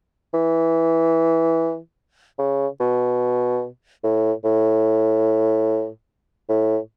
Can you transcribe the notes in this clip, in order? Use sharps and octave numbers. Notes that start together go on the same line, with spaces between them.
E3
C#3
B2
A2
A2
A2